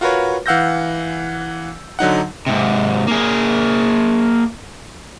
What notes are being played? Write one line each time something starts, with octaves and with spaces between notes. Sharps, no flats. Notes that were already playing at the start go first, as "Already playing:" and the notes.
F4 F#4 A#4 B4 C#5
E3 F5 F#5 E6 G6 A#6
D3 F#3 D#4 F#5
G#2 C3
A#3 G#4